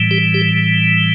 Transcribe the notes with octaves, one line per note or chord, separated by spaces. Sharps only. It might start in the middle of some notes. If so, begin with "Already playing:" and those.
Already playing: A2 E3 G3
G4
G4